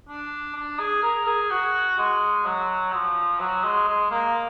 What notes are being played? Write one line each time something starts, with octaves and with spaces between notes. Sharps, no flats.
D4
D4
G#4
A#4
G#4
F#4
G#3
F#3
F3
F#3
G#3
G#3
A#3